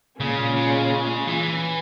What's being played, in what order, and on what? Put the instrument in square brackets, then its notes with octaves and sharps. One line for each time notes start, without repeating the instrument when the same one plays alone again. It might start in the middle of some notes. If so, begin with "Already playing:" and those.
[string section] A#2 G#3 C#4 F4 G#4 [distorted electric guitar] C#3
[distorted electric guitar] C#3
E3